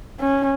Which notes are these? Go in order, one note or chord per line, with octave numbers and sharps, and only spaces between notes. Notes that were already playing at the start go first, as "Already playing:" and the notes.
C#4